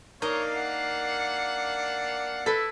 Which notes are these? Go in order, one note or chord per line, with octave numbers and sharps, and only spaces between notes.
A#3 D4 D#4 A#4 C#5 D#5 F5
F#5
E4 A4 B4